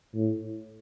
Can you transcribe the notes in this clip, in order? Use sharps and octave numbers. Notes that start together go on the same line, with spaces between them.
A2